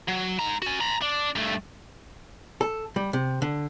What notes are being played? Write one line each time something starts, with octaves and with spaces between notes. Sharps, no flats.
F#3
G#2 A#5
C#4 F#4
A#5 B5
D4
G2 A3
A4
G3
C3
D3